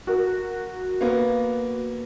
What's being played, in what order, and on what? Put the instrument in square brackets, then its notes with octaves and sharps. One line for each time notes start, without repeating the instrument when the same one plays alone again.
[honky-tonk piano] F#4 A#4
[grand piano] A#3 B3